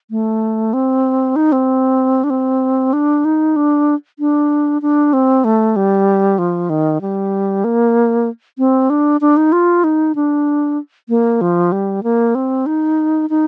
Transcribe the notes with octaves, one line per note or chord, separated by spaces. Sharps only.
A3
C4
D#4
C4
D4
C4
D4
D#4
D4
D4
D4
C4
A3
G3
F3
D#3
G3
A#3
C4
D4
D4
D#4
F4
D#4
D4
A#3
F3
G3
A#3
C4
D#4
D#4